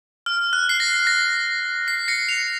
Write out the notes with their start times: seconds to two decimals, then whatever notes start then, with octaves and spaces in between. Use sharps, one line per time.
0.26 F6
0.53 F#6
0.69 C7
0.80 A#6
1.07 A#6
1.88 C7
2.08 A#6 C#7
2.28 C#7 F7